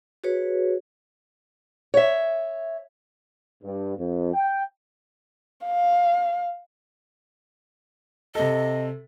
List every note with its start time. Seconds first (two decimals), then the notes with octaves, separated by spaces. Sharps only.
0.24 F#4 G#4 B4 C#5
1.94 C#5 E5
3.63 G2
3.97 F2
4.34 G5
5.66 F5
8.35 C3 A4 D#5